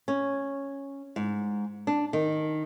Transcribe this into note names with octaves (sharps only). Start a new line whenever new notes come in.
C#4
G#2
D4
D#3